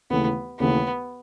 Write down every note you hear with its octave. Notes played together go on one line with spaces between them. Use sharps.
D#2 C#3 E3 A3 B3
D#2 C#3 E3 A3 B3